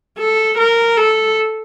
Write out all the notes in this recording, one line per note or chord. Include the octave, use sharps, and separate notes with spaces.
A4
A#4
A4